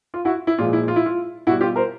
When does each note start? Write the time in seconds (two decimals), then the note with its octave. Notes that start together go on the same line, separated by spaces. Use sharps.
0.14 F4
0.25 E4 F#4
0.47 E4
0.58 A#2 F3 G#3 F4
0.73 E4
0.88 F4
0.96 E4
1.06 F4
1.47 B2 E4 F#4
1.50 G3
1.61 F4 G4
1.76 A#4 C5